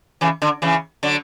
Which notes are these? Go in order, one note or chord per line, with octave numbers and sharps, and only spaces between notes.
C#3 E3
D3
C#3 E3
D3 F#3